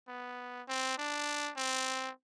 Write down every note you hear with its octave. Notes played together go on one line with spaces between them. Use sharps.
B3
C4
D4
C4